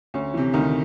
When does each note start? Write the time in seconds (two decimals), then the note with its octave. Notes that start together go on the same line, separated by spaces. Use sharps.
0.14 D2 C#4
0.34 C3 E3
0.53 D2 D#3 D#4